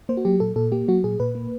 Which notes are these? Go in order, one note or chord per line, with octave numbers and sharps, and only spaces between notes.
A#3 C5
F#4
F#3 G4
A#2 A4
A#2 A4
A#3 G4
F#3 F#4
A#2 G#4
A#2 B4
A#3